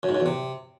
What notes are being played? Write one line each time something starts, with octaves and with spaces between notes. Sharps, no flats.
F#2
G#2
F#2
E2
C3